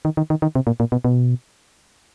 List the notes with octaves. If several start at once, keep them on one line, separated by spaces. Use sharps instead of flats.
D#3
D#3
D#3
D#3
C3
A#2
A#2
B2
B2